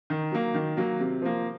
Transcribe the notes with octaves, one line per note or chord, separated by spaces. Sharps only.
D#3
F#3 A#3
D#3
F#3 A#3
C3
F3 A#3